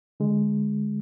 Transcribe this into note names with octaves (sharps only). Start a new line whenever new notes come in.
D3 G#3